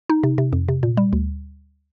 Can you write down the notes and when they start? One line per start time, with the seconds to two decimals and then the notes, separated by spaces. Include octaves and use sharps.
0.09 D#4
0.23 C3
0.38 C3
0.53 F2
0.68 C3
0.83 A#2
0.97 G3
1.13 D2